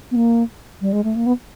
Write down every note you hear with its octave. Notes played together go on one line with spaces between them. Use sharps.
B3
A#3
G3
G#3
A3
A#3
B3